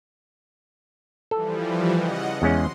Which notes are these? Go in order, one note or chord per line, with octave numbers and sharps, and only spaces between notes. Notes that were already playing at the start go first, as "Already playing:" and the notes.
E3 F3 G3 A4
C#3 D#5 F#5
E2 G#3 C#4 C6